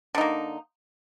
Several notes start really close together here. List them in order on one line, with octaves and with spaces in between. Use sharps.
D3 D#4 A#3